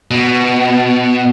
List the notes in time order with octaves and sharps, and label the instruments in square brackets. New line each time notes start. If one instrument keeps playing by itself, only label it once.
[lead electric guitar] B2